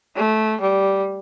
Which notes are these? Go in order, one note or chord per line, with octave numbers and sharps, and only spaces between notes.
A3
G3